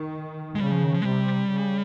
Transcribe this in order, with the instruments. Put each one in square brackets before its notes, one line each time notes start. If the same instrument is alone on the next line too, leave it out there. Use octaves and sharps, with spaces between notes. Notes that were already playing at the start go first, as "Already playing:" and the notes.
Already playing: [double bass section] D#3
[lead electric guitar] G#3
[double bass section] C#3 [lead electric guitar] G3
[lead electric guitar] F3
D#3
F3
G#3
[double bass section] C3 [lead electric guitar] G3
[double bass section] C#3